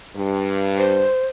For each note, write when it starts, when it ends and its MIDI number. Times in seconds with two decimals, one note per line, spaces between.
0.16 1.05 43
0.78 1.28 72